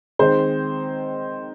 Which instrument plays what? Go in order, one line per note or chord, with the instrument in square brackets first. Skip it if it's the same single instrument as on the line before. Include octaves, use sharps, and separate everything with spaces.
[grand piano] D#3 G#3 C4 C5